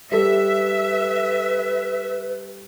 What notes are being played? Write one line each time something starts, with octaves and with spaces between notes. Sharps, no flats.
G3 A4 B4 E5